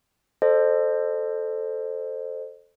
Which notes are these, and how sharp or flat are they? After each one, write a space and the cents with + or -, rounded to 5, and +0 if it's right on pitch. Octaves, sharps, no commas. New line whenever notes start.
A4 +0 C5 +0 D#5 -40